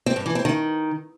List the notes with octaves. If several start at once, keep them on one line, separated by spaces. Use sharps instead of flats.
C4
G2
E3
C4
D#3